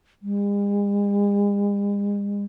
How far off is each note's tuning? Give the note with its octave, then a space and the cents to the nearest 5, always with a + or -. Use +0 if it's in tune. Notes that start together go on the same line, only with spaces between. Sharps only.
G#3 -45